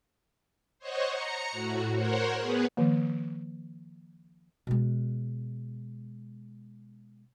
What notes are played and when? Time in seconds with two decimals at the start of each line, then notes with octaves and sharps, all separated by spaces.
0.79 C5 C#5 D#5 F#5 C#6
1.10 A#5 C#7
1.50 A2 F#4
1.95 A#4 C5 C#5 F#5
2.37 B3 G#4 B4
2.77 D#3 F3 A#3
4.67 B2 G#3